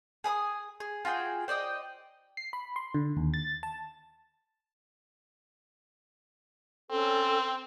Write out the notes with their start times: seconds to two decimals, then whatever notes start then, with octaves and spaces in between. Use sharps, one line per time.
0.24 G#4 G#5 A#5 D#6
0.80 G#4
1.05 F4 F#4 G#4 G5
1.48 C5 D5 D#5 G5
2.37 C7
2.53 B5
2.76 C6
2.94 D3
3.17 D#2
3.34 A6
3.63 A5
6.90 C4 C#4 A4